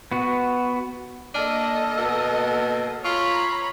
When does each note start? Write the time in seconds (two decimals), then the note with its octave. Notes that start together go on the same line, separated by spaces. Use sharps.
0.12 B3 F#4
1.34 A#3 D4 A4 D#5 A5 F6 D#7
1.98 B2 E6
3.04 F4 C#5 A#5 B5 C#6